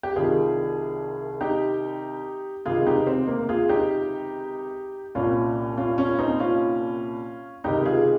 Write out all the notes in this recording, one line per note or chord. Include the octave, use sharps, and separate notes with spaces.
G4
C2 C3 D#3 F4 G#4
D#4 G4
C#2 C3 D#3 F4 G#4
D#4 G4
C4
A#3
F4 G#4
D#4 G4
C2 A#2 C#4 F4
C#4 F4
C#4 F4
C4 D#4
C#4 F4
C#2 C3 D#3 D#4 G4
F4 G#4